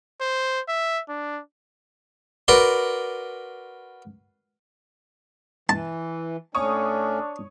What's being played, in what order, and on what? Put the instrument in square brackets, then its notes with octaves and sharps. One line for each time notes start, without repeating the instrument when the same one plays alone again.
[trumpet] C5
E5
D4
[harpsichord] F#4 A#4 B4 D5 C6
[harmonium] E3 [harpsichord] A5
[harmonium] A2 C#4 [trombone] D4 [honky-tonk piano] C#5 C#6 D#6